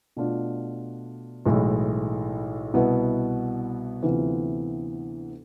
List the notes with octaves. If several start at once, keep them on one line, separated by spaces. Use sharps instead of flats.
B2 A3 D4 F4
B1 A2 E3 G#3
C2 B2 B3 E4
D2 C3 E3 B3 F4